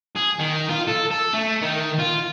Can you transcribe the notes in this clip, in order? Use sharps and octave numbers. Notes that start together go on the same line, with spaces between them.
G#4
D#3
F4
A4
A4
A3
D#3
F4